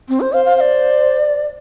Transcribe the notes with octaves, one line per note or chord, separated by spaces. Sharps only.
C4
C5
C5 F5
F5
F5
D5